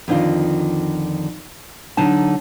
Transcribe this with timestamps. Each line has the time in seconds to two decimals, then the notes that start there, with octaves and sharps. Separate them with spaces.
0.08 F2 D3 D#3 F4
1.97 D3 F#3 D#4 A5